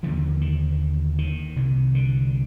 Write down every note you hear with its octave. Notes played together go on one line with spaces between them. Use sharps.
D#2 D3 F3
D#3
D#3
C2 C3
D3